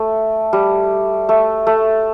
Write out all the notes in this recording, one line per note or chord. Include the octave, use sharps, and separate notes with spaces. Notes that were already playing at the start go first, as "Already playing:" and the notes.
Already playing: A3
G3
A3
A3